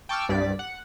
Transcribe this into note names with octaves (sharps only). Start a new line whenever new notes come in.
G5 A5 C#6 D6 E6 F6
C2 G2 D5 B6
F#5